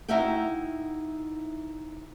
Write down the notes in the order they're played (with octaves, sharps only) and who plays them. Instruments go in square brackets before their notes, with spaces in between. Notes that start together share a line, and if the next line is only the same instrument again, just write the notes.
[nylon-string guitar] D#4 E4 F#4 E5 F5 G5